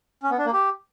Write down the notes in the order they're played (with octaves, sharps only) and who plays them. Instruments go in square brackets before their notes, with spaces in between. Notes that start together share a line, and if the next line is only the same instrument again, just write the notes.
[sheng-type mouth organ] C#4
B3
D4
A#3
G4